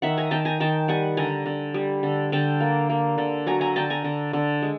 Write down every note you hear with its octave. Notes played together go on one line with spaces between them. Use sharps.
D#3 E5 F#5
G#5 A#5
D#3 G5 A5
G#5 A#5
D#3 G5 A5
G3 F#5 G#5
D3 G#5 A#5
D3
G3
D3
D3 G5 A5
A#3
A#3
D3
F#3 G#5 A#5
G#5 A#5
D3 G5 A5
G#5 A#5
D3
D3
G#3